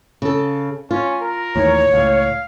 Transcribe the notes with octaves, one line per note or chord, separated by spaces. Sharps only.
C#3 A4
C#4 F4
A#4
D#2 A2 E3 C#5
C#2 A2 F5